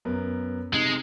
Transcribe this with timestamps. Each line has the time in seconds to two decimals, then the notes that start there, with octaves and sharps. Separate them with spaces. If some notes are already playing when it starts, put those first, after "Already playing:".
0.05 F#2 B3 A#4
0.74 C3 G#3 D#4